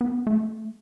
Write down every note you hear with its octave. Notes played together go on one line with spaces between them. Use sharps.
B3
A3